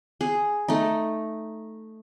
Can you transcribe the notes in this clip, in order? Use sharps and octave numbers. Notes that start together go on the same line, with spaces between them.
G#4
A3 D#4